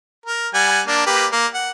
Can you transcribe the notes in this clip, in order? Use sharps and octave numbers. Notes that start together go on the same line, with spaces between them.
A#4
G3 F#5 G#5
A#3 D4
A#3 G4 B4
A#3
F#5